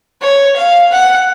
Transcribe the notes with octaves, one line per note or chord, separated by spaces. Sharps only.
C#5
F5
F#5